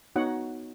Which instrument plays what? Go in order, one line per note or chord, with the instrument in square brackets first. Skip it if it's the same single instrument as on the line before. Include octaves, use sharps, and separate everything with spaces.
[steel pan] B3 D#4 F#4 C#5 F#5